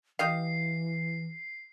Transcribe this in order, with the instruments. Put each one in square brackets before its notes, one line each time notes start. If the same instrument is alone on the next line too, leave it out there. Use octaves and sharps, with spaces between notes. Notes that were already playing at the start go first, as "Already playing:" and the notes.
[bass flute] E3 [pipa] G4 D#5 F5 [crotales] C7